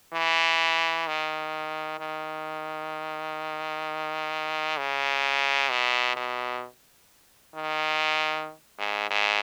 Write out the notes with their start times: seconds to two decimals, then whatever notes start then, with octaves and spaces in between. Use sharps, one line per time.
0.13 E3
1.07 D#3
2.00 D#3
4.78 C#3
5.71 B2
6.16 B2
7.55 D#3
8.79 G#2
9.10 G#2